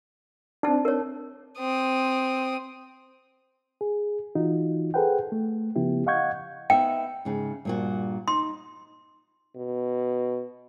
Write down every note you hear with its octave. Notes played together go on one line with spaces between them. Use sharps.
C4 D4 D#4 A5
A#4 C#5
C4 D#6
G#4
E3 D#4 F4 F#4
G#4 A4 B4 C5 F#5 G5
A3
C#3 F3 B3 E4 G4
D#5 F5 F#5 C#6 G6 G#6
B3 D#4 E5 G5
G#2 C#3
G2 A#2 F#4
D#4 C6
B2